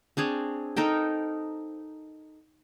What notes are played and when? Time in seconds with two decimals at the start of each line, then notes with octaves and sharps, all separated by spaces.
0.17 C4 D4 G#4 C#5
0.76 D#4 A4 A#4 G5